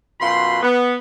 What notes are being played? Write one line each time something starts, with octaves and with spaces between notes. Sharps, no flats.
F#2 B2 F4 B5 C6
B3